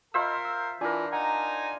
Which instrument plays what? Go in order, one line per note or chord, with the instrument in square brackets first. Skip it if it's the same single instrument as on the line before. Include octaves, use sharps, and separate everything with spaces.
[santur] F4 C5 E5 [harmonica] A#4 [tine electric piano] D#5 B5 E6
[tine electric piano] E6
[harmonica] E3 [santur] D4 A#4 [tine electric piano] F4 G#5
[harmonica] D#4 G#5 A#5 [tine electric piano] F#5